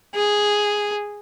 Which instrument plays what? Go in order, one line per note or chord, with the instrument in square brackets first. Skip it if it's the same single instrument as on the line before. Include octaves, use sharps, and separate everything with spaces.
[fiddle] G#4